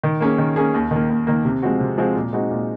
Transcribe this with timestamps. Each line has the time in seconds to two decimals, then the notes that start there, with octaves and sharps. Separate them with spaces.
0.03 D#3
0.20 A#3 C#4 G#4
0.38 D#3
0.56 A#3 C#4 G#4
0.74 D#2
0.91 D#3 A#3
1.10 D#2
1.27 D#3 A#3
1.45 C3
1.62 F3 G#3 C4 F#4
1.80 C3
1.98 F3 G#3 C4 F#4
2.16 A#2
2.33 G#3 C4 D#4 F#4
2.51 A#2